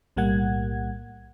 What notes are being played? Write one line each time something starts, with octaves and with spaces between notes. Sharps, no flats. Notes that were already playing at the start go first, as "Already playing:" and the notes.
B1 A2 G3 A#3 F#5 G#6